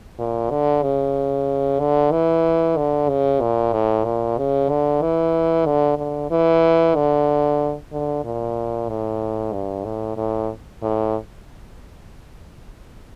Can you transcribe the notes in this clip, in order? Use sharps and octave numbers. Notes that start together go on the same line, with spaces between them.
A#2
D3
C#3
D3
E3
D3
C#3
A#2
A2
A#2
C#3
D3
E3
D3
D3
E3
D3
D3
A#2
A2
G2
A2
A2
A2